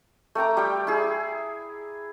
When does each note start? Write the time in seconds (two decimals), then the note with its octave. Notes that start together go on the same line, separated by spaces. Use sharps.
0.35 A3 G5 A#5 D6
0.57 G3 G5
0.87 E4 G#4